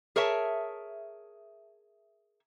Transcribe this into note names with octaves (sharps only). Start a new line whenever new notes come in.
G#4 A#4 C#5 E5 A5